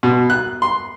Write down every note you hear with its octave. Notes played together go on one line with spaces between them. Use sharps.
B2
F#6
C6